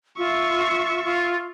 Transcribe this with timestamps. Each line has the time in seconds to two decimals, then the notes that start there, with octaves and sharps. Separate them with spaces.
0.18 F4 E5 C#6
1.04 F4